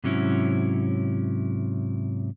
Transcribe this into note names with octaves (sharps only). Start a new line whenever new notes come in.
G#2 C3 F#3 C#4 E4